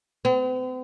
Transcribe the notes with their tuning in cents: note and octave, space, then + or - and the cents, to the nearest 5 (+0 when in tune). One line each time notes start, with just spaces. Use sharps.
C4 -45